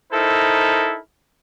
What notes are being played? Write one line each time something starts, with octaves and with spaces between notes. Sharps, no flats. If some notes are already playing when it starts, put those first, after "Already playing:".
D#4 E4 A4 A#4 C5